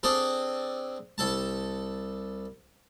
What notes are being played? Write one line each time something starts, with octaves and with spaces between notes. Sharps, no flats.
C4 D4 G#4 A4
C2 A4 A5